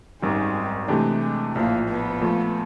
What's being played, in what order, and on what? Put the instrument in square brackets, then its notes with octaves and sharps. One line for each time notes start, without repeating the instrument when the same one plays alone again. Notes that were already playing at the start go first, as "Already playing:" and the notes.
[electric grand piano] G#1 F#2 D#3 G3 [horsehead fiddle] G#3
[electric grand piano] C3 E3 A3 D4 G4 [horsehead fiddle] G#3
[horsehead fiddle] G#3
[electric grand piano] A#1 A2 F3 [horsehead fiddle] A#3
[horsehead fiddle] B3
[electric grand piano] A#2 F3 A3